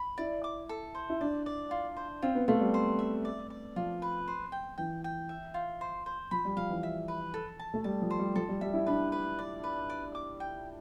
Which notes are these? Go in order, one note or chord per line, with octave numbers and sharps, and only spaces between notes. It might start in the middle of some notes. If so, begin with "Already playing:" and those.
Already playing: B5
E4 D5
D6
A4
C5
E4
D4 D5
D5
F4
C5
C4 F4
B3
A3 F4
G3
C5
E5
D5
D5
F3 F4
B4
C5
G5
E3 G5
G5
E5
F4
C5
C5
F3 B5
G3
F3 F5
E3
E5
B4
A4
A5
A3
G3 A5
F3
C5
G3
F3 A4
G3
G3 E5
E4
D4 B4
B4
D5
B4
D5
D6
G5